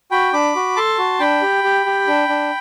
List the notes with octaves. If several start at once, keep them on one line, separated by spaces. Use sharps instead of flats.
F#4 G5 B5
D4 B5 D6
F#4
A4 A5 C6
F#4
D4 G5 B5
G4
G4
G4
D4
D4